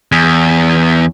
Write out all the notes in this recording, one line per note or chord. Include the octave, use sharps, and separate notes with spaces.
E2